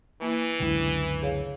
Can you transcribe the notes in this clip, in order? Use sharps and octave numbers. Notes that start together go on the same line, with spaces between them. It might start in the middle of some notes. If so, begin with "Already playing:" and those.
E3 A#3 E4
C#2 F#2 D3 G#3 E4
G#4 C#5 F5